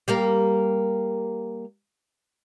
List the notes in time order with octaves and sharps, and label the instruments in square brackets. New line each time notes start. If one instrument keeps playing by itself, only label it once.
[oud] G3 A#3 A#4